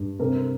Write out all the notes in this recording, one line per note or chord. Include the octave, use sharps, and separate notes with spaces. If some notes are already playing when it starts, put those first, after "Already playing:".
Already playing: G2
C3 A#4